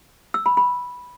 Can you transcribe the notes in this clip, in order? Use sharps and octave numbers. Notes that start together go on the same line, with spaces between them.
E6
B5
B5